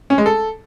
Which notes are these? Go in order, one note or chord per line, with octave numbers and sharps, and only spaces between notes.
C#4
G#3
A4